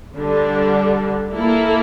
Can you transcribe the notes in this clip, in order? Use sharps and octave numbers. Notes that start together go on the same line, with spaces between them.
D3 G3 D4
A#3 E4 A4